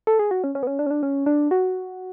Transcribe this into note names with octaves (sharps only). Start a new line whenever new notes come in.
A4
G#4
F#4
C#4
C#4
B3
C#4
D4
C#4
D4
C#4
D4
F#4